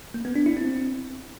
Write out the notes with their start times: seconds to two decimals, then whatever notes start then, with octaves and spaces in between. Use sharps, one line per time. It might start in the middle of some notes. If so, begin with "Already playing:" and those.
0.14 A#3
0.25 B3
0.36 D4
0.46 E4
0.57 C4